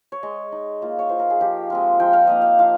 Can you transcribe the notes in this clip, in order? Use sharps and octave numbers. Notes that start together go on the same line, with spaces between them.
C#5
G#3 D#5
D#4
A#3 F4
C#5
F4 C5
A#4
G#4
F3 G4
G#3 C4 F4
F3 G5
F5
A#3 D#4 D#5
F5
F3 F5